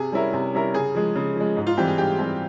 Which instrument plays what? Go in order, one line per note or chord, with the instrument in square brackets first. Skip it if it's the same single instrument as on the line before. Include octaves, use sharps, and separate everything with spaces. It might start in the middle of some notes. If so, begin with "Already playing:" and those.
Already playing: [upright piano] C3 [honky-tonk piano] G#4
[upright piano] G3 C#4 E4 A#4
C3
G3 C#4 E4 A#4
[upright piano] C#3 [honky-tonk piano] G#4
[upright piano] F3 G#3
C#3
F3 G#3
G#2
[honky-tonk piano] F4
[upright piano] E3 G3 C4 [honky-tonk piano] G4
[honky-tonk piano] G#4
[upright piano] G#2 [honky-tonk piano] G4
[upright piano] E3 G3 C4